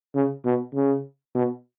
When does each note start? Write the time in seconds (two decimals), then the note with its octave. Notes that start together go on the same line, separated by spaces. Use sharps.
0.15 C#3
0.45 B2
0.75 C#3
1.35 B2